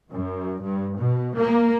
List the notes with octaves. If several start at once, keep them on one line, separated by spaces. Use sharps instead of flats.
F#2
G2
B2
A#3